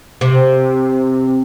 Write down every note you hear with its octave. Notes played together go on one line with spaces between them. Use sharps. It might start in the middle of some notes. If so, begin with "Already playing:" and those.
C3